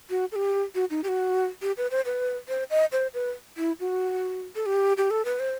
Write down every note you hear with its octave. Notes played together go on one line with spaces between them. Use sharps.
F#4
A4
G4
F#4
D#4
G4
F#4
G4
B4
C5
B4
C5
D#5
C5
B4
E4
F#4
A4
G4
G4
A4
B4
C5